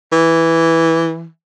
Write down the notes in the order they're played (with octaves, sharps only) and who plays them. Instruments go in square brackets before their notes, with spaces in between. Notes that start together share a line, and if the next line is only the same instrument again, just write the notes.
[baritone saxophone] E3